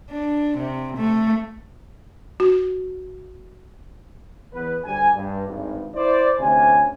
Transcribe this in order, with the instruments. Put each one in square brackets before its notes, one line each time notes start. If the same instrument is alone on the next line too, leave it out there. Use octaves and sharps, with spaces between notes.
[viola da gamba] D4
C3
A3
[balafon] F#4
[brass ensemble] E2 B3 B4
D2 G3 G#5
G2
G#1 G2
E4 C5 D5
D2 C3 C#4 G#5